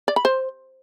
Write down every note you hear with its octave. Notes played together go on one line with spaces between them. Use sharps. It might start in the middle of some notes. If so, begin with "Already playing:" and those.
D5
B5
C5